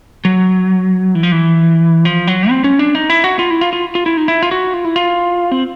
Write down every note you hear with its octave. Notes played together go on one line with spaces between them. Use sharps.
F#3
E3
F3
E3
F3
F#3
C4
C#4
D4
D#4
E4
F#4
F4
E4
F4
F4
F4
E4
D#4
E4
F4
F#4
F4
E4
F4
C4